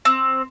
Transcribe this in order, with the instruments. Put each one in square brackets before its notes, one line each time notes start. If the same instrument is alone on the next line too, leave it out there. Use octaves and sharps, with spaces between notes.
[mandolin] C4